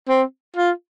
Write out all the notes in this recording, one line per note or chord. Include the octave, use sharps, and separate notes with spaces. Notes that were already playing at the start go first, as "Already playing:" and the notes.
C4
F4